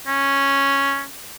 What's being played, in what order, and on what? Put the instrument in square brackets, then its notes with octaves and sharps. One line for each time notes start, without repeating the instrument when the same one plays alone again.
[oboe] C#4